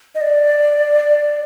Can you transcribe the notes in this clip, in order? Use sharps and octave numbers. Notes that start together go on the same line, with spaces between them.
D#5
D5